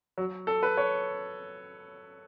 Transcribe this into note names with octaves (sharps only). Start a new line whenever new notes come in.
F#3
A4
B4
C#5